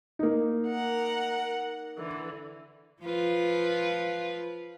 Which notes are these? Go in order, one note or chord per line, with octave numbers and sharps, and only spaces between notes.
A#3 D#4
A#4 F#5
D3 E3
F3 F4 B4